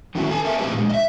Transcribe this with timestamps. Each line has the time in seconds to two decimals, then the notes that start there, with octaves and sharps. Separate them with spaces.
0.15 D3 D#3 A3 C#4 E4 F#4
0.30 A4 G#5 A5
0.44 A#4 E5 G#5 A5
0.58 G3 A3 C4 G4 G#4 B4
0.74 A#2 G#3
0.89 D#5 E5